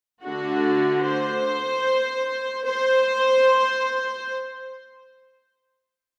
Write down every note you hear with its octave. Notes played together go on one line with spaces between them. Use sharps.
D3 A3 D4 F#4
C5
C5